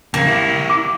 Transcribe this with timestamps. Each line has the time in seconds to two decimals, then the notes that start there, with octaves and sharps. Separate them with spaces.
0.14 F2 C#3 A#3
0.27 E4 G4
0.70 D6